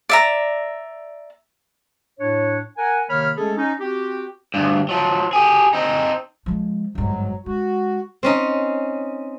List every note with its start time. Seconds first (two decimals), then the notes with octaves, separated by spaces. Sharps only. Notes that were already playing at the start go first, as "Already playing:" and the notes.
0.09 D5 E5 A#5
2.20 A2 D4 C#5
2.77 A#4 F#5 G#5
3.09 C3 D#3 A#3 C#5 B5 F6
3.37 G#3 A3 C#4 G#4 A4
3.57 C#4 D#4
3.80 C4 F#4 G4
4.54 D2 G2
4.89 F3 F#3
5.33 G4 G#4
5.73 C4 D#4
6.46 F3 G#3
6.95 G1 G#2 F#3
7.46 G#3 F#4
8.23 C4 C#4 D#4